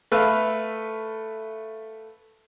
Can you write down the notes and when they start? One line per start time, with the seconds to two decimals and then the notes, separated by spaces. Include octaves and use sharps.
0.12 A3 B4 E5 F5